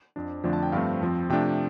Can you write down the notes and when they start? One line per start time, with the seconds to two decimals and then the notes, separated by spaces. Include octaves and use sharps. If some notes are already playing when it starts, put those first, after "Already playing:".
0.16 F2 F3 D4
0.44 F2 D3 F3 A3 D4
0.53 A5
0.63 G5
0.72 G2 F3 A3 C4 F5
1.01 F2 F3 C4
1.30 C3 F3 A3 D4 G5